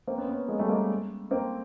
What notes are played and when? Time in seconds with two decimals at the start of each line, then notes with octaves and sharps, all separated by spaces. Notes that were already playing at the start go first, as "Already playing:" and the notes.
0.07 A#3 C4
0.18 B3 C#4
0.28 B3 C#4
0.48 G#3 A#3
0.59 G3 A3
0.69 G#3 A#3
1.31 A#3 C4